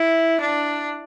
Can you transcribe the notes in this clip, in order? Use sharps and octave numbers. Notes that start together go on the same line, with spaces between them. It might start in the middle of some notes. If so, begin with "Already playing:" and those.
Already playing: E4
D4